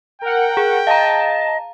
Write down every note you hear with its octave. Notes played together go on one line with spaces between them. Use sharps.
A#4 F#5 G5
G#4
D#5 F5 A5 A#5